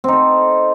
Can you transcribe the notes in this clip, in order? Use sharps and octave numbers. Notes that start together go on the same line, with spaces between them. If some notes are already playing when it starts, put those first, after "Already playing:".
C4 D#4 A4